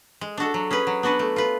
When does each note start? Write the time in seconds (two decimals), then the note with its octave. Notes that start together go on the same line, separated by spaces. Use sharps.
0.21 G#3
0.38 D4 F#4 A4
0.54 F#3
0.71 C#4 G#4 B4
0.87 F#3
1.03 B3 D4 F#4 B4
1.19 A3
1.36 F4 B4